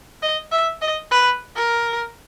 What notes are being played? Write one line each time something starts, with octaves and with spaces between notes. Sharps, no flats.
D#5
E5
D#5
B4
A#4